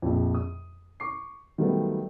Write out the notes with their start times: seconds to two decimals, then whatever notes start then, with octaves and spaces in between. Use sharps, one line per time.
0.02 A#1 F2
0.35 D#6
1.00 C#6 D6 C7
1.58 D#3 F#3 G3 A3 B3